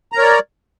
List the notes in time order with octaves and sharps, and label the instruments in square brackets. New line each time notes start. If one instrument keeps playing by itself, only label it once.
[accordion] A#5
A#4
C#5
D5